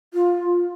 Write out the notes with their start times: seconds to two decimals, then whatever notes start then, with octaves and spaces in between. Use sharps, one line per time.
0.14 F4